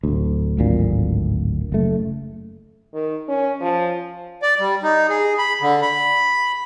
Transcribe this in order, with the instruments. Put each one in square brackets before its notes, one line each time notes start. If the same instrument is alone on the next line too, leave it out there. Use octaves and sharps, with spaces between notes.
[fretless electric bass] D1 D2
D1 G#1 D2 A#2
F#1 A3
[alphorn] D#3
C#4
F3
[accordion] D5
G3
D#4
G#4
B5
D3
B5